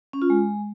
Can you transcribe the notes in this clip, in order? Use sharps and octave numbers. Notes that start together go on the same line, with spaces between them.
C#4
F4
G#3